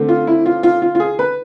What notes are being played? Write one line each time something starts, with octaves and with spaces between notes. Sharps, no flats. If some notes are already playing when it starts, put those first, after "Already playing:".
Already playing: D3 A3 C4
F4
E4
F4
F4
F4
F4
G#4
B4